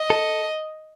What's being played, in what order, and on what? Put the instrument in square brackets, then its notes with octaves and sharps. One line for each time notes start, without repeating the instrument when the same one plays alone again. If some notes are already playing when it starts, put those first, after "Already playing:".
Already playing: [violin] D#5
[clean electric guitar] A4